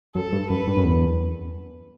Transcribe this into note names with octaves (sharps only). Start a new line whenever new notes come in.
F#2 A4
G2
F#2 B4
G2
F#2
E2